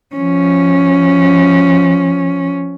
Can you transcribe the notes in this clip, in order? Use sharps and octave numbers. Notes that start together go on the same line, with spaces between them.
F3 C#4